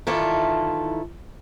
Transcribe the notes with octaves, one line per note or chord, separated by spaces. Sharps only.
D#3 E3 E4 F4 A4 D5